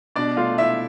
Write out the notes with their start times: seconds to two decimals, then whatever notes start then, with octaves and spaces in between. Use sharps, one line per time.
0.16 B2 D4 D5
0.37 A3 F4 F5
0.58 E4 E5